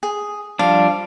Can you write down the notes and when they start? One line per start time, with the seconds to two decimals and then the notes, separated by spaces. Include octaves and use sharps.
0.03 G#4
0.59 F3 G3 D4 F5